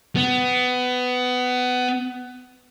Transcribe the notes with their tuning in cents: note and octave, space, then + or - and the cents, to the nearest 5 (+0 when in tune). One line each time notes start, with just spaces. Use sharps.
B3 +20